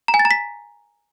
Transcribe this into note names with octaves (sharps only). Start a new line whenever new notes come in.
A#5
G#5
A6
A#5
B6